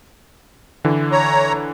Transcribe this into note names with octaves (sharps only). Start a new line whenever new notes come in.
D3 E3
C#5 A#5